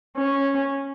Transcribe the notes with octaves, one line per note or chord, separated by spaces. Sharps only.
C#4